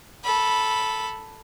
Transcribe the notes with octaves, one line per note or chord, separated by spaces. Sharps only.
A4 B5